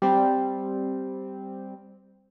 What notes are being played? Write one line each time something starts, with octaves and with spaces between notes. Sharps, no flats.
G3 C4